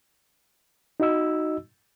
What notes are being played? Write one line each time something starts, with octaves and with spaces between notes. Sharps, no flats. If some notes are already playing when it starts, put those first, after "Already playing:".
D#4 F#4 D#5 E6